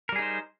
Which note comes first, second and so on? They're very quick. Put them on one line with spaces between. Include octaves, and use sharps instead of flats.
A#4 G3 G#4 D#4 C5